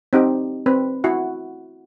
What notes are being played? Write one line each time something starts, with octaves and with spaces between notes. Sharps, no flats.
C4 D#4 G4
C4 B4
E4 F#4 F#5